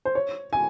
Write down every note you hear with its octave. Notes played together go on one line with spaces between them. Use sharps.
C5
C#5
G#5